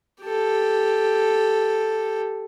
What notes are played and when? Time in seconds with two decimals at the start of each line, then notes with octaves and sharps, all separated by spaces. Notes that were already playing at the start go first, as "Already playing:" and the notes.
0.22 G4 A4